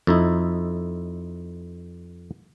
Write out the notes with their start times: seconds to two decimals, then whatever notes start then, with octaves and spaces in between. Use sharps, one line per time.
0.07 F2 D#4 E4